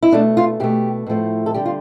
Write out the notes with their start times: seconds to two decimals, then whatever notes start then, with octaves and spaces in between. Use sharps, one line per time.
0.03 E4
0.12 B2 A3 D4
0.37 F4
0.60 B2 A3 G4
1.06 A2 F3 A3
1.46 A4
1.54 D3 G3 G4
1.65 F4